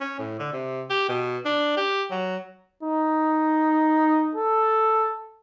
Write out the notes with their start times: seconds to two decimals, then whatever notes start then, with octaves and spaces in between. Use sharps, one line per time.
0.01 C#4
0.19 A2
0.40 D3
0.53 C3
0.90 G4
1.09 B2
1.45 D4
1.77 G4
2.11 F#3
2.83 D#4
4.35 A4